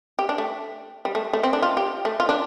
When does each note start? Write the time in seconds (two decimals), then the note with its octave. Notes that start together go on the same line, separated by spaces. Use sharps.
0.19 G4
0.29 D4
0.38 A3
1.05 G3
1.15 A3
1.33 A3
1.43 C4
1.53 D4
1.62 F4
1.77 G4
2.05 A3
2.20 F4
2.29 D4